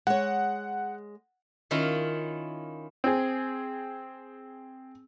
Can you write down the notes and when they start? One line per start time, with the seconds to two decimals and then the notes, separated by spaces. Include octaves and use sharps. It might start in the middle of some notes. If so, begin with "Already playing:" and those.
0.07 G#3 C#5 F#5
1.71 D#3 C#4 E4 F4
3.04 C4 G#4